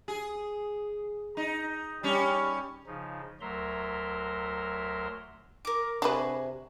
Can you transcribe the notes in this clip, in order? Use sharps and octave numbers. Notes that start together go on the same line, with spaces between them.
G#4
D#4
G3 C#4
C#3 F3 D#4
D2 F#3 A#4 E5 A#5 C6
A#4 D6
C3 D4 F#4 G#4 B4